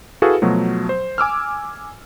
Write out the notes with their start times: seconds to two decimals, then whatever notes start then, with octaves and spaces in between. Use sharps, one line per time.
0.22 E4 F#4 G#4 A4 B4 F5
0.42 B2 F3 F#3 A3
0.89 C5
1.18 G#5 D6 E6 F6